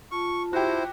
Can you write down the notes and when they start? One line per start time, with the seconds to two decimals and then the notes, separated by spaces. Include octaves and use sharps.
0.12 F4 A5 C#6
0.53 E4 F#4 G4 C5